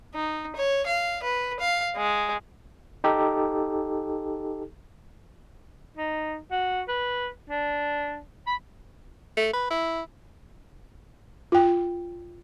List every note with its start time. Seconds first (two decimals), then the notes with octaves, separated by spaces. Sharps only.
0.15 D#4
0.56 C#5
0.87 F5
1.23 B4
1.60 F5
1.97 G#3
3.04 D#4 G4 A4
5.98 D#4
6.51 F#4
6.88 B4
7.50 D4
8.47 B5
9.37 A3
9.53 B4
9.70 E4
11.52 F4 G5